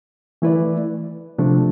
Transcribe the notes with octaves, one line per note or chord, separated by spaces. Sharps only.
E3 A3 E4 B4 D5
C3 F3 A3 D4